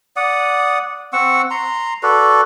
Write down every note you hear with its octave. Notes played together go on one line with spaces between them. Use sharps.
D5 F#5 D#6
C4 F#5 C#6 E6
A#5 C6
F#4 A4 B4 D5